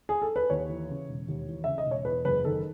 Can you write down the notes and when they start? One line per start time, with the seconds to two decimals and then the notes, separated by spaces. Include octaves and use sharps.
0.09 G#4
0.22 A4
0.36 B4
0.50 D#2 C#5
0.69 E3
0.89 C#3
1.09 E1
1.28 D#2
1.48 E3
1.64 C#3 E5
1.78 D#5
1.86 E1
1.91 C#5
2.05 E2 B4
2.25 F#1 B4
2.45 D#3 A4